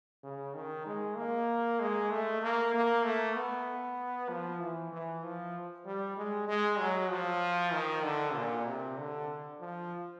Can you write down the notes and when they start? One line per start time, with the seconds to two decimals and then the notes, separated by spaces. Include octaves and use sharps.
0.24 C#3
0.54 D#3
0.86 G#3
1.17 A#3
1.80 G#3
2.11 A3
2.42 A#3
2.74 A#3
3.04 A3
3.36 B3
4.29 F3
4.61 E3
4.93 E3
5.23 F3
5.86 G3
6.17 G#3
6.48 G#3
6.79 F#3
7.11 F3
7.73 D#3
8.04 D3
8.35 A#2
8.66 C3
8.98 D3
9.60 F3